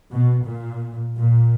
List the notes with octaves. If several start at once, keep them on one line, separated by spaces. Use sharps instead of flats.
B2
A#2
A#2